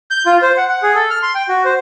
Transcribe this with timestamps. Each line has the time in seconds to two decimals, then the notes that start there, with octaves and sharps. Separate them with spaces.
0.11 G6
0.26 F4
0.42 C5
0.57 F#5
0.69 F#5
0.83 G#4
0.95 A4
1.10 F6
1.23 C6
1.35 G5
1.48 F#4
1.65 C5